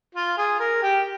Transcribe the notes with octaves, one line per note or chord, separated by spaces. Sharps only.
F4
G#4
A#4
G4